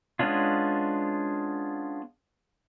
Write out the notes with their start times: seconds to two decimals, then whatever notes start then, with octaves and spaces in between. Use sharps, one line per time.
0.19 G#3 B3 C#4 D4 F4